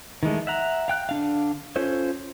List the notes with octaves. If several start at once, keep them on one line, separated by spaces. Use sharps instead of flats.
D#3 E3 G#3 A3
E5 F#5 A#5
F5 G5 F#6
D3 D4 F5
C#4 F4 A4 C5 C#5